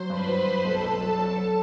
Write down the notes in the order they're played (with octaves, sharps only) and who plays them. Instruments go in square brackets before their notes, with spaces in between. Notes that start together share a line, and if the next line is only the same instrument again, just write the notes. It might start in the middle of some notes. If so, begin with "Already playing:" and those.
Already playing: [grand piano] F#3 [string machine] C5 C6
[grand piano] G2 [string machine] B4 B5
[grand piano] F#3
G2
[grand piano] B1 [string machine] A4 A5
[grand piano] B1
F#3
F#3
F#3